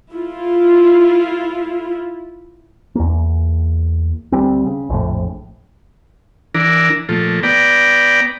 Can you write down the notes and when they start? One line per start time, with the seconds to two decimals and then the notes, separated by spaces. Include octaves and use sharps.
0.12 E4 F4
2.95 E2 A#3
4.32 D2 G3 C4
4.66 C#3
4.90 A#1 F2 A2
6.54 E3 D4 A#4
7.09 A#2 F3 A3
7.43 B3 D5 G5 A#5